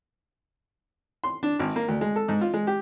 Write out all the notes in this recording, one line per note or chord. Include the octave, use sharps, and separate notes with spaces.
C6
D4
G#1
A#3
D2
G#3
A4
G#2
F4
G#3
G4